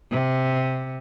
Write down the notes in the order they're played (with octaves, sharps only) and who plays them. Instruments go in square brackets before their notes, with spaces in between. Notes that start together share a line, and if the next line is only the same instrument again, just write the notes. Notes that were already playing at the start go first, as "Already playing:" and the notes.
[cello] C3